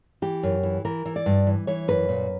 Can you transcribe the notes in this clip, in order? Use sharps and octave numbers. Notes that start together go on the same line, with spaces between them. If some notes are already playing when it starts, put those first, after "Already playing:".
E3 G4
F#2
E3
E3 A#4
E3
D5
G2
E3
E3 C#5
F#2 B4
A#2